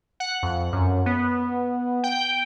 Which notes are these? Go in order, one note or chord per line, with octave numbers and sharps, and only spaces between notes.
F#5
F2
F#2
B3
G5